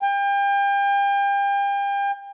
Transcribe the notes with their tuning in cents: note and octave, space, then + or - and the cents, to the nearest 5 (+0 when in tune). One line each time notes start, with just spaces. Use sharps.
G5 +35